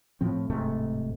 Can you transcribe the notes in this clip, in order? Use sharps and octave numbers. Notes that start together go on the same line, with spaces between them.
A2 F3 C4
D1 G#2 C3 A3